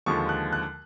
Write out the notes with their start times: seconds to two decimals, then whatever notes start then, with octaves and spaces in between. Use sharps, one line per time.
0.06 D#2 D3 F3 G#3 C#6
0.29 F#6
0.53 F#6